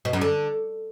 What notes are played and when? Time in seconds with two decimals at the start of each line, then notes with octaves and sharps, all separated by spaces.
0.05 B2
0.13 F#2
0.21 D3